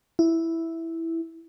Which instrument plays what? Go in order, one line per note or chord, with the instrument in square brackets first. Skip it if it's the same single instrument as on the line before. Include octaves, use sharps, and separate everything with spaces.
[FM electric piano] E4